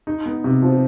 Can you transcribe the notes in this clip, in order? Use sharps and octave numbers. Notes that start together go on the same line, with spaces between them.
D#4
B3
C3
F3